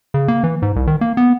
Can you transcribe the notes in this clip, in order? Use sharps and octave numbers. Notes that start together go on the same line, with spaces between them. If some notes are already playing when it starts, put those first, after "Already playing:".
C#3
A#3
E3
G#2
C2
D#3
A#3
B3